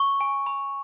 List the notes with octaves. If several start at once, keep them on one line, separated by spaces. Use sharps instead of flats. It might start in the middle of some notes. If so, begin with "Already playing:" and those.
Already playing: C#6
G#5
B5